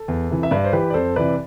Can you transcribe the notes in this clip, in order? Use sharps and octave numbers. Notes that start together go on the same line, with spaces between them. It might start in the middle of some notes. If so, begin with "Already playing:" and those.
Already playing: A4
E2
C3 E3
E5
G2 B4 D5
C5
E3 G4 B4
D5
F2 A4 C5
C3 E3 B4 D5